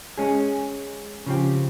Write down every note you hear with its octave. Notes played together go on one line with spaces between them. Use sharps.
G#3 C#4 G#4
C#3 F3 C4 G4